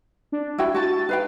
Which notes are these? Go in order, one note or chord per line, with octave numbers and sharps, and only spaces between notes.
D4
E4 F#4 G5
F#4 A5 A6
D#4 B4 F5 G5